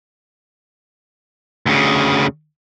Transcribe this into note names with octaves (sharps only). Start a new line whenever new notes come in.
D2 C#3